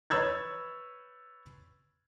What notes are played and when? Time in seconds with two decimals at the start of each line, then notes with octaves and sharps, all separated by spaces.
0.10 B4 C#5 B5 E6 G#6 A6